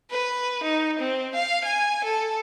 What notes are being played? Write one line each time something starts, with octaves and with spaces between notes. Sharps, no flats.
B4
D#4
C4
F5
G#5
A4